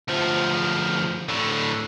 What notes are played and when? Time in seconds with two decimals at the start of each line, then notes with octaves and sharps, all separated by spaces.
0.08 D2 F3
1.29 A2 D3